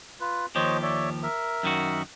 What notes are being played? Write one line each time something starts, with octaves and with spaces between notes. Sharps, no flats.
F4 B4
D#2 F3 G4 C5 C#5 D#5
C#5 D5 E5
A#4 E5
F#2 D#3 F#4